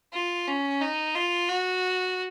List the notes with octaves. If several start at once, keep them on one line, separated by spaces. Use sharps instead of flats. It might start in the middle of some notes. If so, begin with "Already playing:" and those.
F4
C#4
D#4
F4
F#4